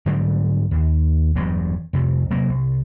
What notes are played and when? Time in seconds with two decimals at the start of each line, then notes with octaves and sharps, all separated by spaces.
0.06 G#2 D3 F#3 G3
0.71 D#2
1.35 E1 E2 G2 F#3
1.93 C2 F2 C3
2.30 C3 F#3 A#3
2.49 C2